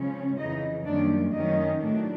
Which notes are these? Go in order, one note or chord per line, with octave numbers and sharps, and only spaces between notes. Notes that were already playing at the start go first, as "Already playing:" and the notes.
Already playing: C#3 F3 G#3 C#4
F2 C#3 E3 D#4 D#5
F#2 D#3 G3 A#3 C#4 D4 D5
F#2 D#3 F#3 A3 C#4 D#4 D#5
A2 F#3 A3 D4